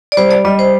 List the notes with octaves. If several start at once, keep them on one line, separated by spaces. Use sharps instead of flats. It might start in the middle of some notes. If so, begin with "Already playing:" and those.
D5
G3 C5
D5
G3 D#5
C5